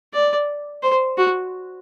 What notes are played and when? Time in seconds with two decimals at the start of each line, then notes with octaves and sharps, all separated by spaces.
0.13 D5
0.82 C5
1.18 F#4